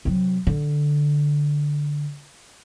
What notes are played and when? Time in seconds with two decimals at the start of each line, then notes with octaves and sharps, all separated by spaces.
0.05 C3 F#3
0.47 D3